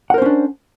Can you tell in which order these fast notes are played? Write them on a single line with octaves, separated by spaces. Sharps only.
F#5 A#4 C5 C#4 D4